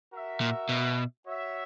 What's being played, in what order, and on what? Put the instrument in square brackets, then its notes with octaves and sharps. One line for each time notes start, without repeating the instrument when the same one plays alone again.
[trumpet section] F#4 A#4 E5
[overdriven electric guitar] A#2
B2
[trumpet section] F#4 C#5 E5